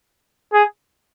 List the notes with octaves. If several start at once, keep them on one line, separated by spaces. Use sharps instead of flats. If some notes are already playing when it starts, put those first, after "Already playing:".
G#4